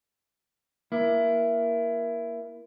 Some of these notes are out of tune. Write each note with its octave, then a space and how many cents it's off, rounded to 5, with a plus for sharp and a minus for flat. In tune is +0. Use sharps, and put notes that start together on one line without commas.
A#3 +20 E4 +20